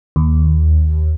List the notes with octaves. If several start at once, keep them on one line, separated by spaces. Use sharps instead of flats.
D#2